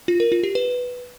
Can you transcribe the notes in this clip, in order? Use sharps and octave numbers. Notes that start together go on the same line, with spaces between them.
F4
A#4
F4
G4
B4